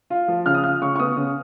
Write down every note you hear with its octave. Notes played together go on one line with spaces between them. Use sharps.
F4
F3
C#3 F6
D#6
F4 F6
C#3 C#6
C#6
B3 D#6
C#3